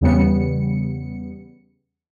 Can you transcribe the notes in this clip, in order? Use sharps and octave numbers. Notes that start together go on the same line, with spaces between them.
E2 C#3 G3 B3 C#7